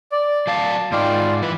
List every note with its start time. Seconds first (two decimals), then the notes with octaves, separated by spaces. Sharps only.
0.12 D5
0.47 F#3 D5 F5 A5
0.92 G#2 D#4 F4 D5 G5
1.42 E3 B4